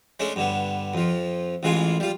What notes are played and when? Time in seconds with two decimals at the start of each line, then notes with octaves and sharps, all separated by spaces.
0.20 G#3 A3 C#4 D4
0.36 G2 D3 B3
0.94 F2 F3
1.63 A1 E3 G#3 F4 G#5
2.00 G3 F4